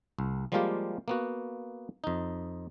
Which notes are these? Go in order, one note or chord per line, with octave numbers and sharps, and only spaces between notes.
C2
F3 G3 G#3 A#3 F4 G4
A#3 B3 F#4
F2 D#4